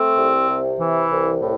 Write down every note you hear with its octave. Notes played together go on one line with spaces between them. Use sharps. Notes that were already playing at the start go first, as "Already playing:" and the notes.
Already playing: A3 C4
C2
C3
E3
C2
A2